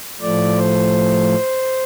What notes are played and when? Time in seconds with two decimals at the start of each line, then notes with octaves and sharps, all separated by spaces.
0.21 A2 F3 A3 D5
0.57 C5